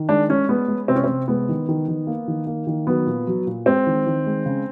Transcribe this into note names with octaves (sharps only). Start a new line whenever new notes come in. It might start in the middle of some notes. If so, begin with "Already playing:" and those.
Already playing: D#3
G#3 D4
G#3 C#4
G#3 B3
G#3
C3 C4
C#4
C4
C3
G#3 B3
D#3
D#3
D#3
A#3
D#3
A#3
D#3
F#3 B3
A#2
F#3
A#2
G#3 C4
D#3
D#3
G#3
C#3